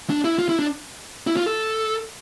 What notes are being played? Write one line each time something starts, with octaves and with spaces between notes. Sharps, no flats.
D4
E4
F4
E4
D4
E4
F4
A4